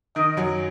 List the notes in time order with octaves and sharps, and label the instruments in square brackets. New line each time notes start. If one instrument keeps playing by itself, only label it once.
[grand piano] D#3 [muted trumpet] D#5
[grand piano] F#2 F#3